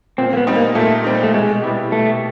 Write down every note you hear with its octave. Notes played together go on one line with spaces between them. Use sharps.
A#2 C4
A#3
B3
G3 C4 D#4
A#3
A#2 A3
G3 C4 D#4
A3
B2 G#3
G3 B3 E4 G4
B2 A3